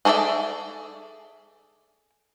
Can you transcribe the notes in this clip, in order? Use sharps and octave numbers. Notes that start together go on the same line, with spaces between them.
G#4 A4 C#5 D5 E5